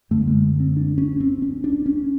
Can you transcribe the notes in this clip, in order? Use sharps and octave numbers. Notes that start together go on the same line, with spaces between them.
F#2 D3 A3
A3
G#3
C4
D4
C#4
C4
C#4
D4
C#4